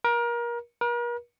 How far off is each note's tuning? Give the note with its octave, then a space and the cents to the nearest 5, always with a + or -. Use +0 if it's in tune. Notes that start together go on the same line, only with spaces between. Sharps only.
A#4 +30
A#4 +45